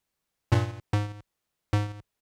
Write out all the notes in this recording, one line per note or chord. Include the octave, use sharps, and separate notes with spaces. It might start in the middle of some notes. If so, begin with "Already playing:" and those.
G2 A#2
G#2
G#2